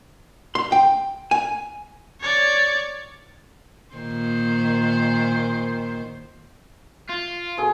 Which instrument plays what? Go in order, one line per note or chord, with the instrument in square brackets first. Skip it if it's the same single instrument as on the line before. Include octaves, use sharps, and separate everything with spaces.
[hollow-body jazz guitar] C6
G5
G#5
[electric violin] C#5 D5
[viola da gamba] A#2 D#3 C5
[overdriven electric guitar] F4
[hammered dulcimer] B2 G#4 A4